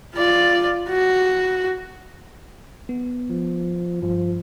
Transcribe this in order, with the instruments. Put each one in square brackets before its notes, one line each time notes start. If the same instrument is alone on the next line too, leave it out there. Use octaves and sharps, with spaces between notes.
[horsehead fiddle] F4 D5
F#4
[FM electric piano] B3
[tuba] F3
[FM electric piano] G2 [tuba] F3